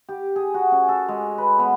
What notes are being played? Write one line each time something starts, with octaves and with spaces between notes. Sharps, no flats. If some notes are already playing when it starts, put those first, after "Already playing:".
G4
G#4
F#4
C#4
A4
G#3
B4
B3